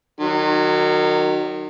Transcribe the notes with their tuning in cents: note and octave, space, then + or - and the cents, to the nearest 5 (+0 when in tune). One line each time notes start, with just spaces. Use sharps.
D#3 -30 F#3 +0